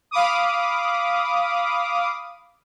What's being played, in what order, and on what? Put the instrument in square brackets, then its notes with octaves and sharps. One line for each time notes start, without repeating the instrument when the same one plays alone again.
[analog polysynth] F5 B5 D6 D#6